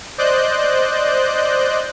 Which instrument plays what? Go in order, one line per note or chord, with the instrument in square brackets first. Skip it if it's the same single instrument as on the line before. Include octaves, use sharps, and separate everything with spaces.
[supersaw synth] C5 D5 D#5 F#6 G6